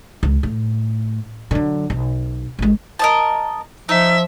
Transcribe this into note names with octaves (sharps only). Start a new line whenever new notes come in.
C#2
A2
D3 F#3
B1
A1 G#3
A#4 D#5 A5
F3 D#4 E5